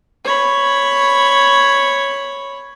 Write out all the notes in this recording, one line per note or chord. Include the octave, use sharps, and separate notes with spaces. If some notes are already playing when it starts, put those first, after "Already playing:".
C#5 B5